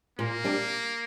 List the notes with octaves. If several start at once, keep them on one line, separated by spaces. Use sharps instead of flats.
A#2 A#3
G3 D4